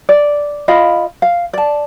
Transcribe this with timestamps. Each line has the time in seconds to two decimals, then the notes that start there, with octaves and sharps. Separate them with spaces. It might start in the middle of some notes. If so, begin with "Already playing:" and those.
0.09 D5
0.68 F4 D#5 F5 B5
1.22 F5
1.53 D5 A5